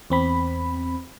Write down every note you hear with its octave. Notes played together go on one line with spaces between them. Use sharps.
E2 C4 B5